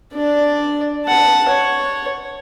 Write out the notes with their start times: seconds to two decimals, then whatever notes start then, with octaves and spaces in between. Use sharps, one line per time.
0.13 D4 D5
1.06 F#5 A5
1.48 C#5